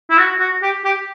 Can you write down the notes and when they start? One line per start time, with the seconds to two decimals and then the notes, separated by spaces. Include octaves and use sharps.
0.10 E4
0.17 F#4
0.40 F#4
0.63 G4
0.85 G4